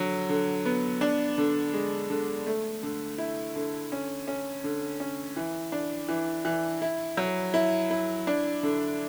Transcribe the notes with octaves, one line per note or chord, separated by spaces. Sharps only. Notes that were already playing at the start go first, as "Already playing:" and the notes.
Already playing: D3 F#3
D3
B3
D4
D3
G#3
D3
A3
D3
E4
D3
C#4
C#4
D3
C#4
E3
D4
E3
E3
E4
F#3
E4
E4
D4
D3